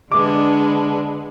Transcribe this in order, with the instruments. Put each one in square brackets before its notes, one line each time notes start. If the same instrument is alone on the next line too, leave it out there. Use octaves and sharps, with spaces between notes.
[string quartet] D3 G#3 B3 D4 [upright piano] D6